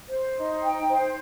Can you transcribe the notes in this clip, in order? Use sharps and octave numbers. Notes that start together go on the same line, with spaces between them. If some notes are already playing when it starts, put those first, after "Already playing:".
C5
D#4
G5
C5